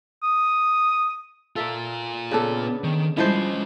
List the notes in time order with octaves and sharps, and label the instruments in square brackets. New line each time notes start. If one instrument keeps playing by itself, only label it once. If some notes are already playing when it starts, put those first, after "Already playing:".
[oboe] D#6
[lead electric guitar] F4 A#4 [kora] A4 E5
[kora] C#3 D4 A4 [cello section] B3
[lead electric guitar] D#3
[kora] E3 F3 C5 [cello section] G3 G#3 [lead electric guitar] C#4 D#5